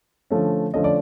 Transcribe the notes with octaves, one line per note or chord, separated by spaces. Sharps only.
D3 F3 A3 C#4
D3 F3 A3 C#4 D#5
D5